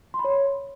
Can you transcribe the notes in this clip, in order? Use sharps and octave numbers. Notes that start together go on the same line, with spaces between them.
C6
B5
C#5